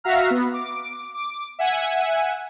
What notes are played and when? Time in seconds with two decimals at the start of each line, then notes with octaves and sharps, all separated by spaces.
0.04 F#4 E5 F5 A#5 F6
0.30 B3
0.53 D6
1.14 D6
1.59 E5 F#5 G#5